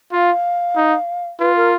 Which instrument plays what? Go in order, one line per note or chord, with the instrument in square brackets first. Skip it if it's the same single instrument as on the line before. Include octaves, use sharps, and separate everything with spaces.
[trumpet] F4 [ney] F5
[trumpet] D#4
[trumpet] F4 [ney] B4
[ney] A#4